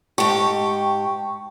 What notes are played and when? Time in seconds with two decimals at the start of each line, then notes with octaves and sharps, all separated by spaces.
0.18 G#2 G4 G5 A5 C#6